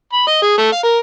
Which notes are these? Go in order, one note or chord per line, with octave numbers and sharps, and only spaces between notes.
B5
D#5
G#4
A3
F5
A#4